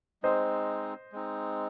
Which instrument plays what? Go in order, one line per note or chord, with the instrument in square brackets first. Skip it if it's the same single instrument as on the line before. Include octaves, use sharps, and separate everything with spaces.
[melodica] G#3 C4 D#4 [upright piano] C5 D#5
[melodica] G#3 C4 D#4